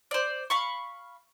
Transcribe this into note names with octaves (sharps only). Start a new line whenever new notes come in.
C5 D5
F5 B5 C#6